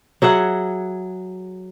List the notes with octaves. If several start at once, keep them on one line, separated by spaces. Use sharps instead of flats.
F#3 G#4 E5 F#5